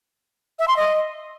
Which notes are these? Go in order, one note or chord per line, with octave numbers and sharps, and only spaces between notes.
E5
C6
D#5